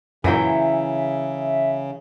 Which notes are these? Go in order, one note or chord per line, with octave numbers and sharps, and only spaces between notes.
F#2 A#2 C#3 E3 F#3 E5 G5